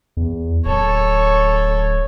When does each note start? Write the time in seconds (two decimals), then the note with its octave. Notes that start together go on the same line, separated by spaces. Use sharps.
0.17 E2
0.65 D1 A4 C#5